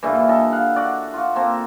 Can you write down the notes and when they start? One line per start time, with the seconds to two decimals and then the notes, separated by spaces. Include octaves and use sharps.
0.03 G2 A#2 E3 E5
0.29 A4 D#5
0.52 F5 F#5
0.76 F#4 D5
1.14 F4 F#4
1.35 A#3 C4 A4